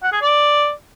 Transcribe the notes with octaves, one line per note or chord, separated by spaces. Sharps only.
F#5
G#4
D5